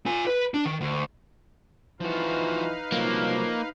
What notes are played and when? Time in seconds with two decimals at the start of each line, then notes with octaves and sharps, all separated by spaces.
0.06 F4 G#5
0.27 B4
0.54 D4
0.66 D#3
0.81 D2
2.01 E3 F3 D#4 F#4 B4 F5
2.92 C2 F3 F#3 A#3